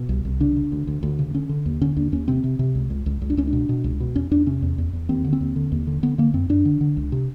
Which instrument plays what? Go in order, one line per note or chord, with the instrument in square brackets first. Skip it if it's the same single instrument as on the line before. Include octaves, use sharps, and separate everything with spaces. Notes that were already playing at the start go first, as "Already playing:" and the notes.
Already playing: [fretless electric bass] B2
C2
C2
C#3 D4
C#3
D2
D2
D2
C#3
D3 C#4
D3
D#2
D3 C#4
D#2 D4
D#2 C#4
C3 C4
C3
C3
C#2
C#2
C#2
C#2
D4
C#2 C#4
D4
B2
B2
C#2
B2
E2 C#4
E2 D4
C3 C#4
E2
E2
E2
D#2 C4
D3
C4
D#2
D3
D#2
D3
D3 B3
D3 A#3
F#2 C4
F#2 D4
D3
D3
C#2
C3